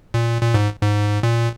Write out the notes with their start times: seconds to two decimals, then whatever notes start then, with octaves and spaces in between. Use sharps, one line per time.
0.14 A#2
0.42 A#2
0.54 G#2
0.82 G#2
1.23 A#2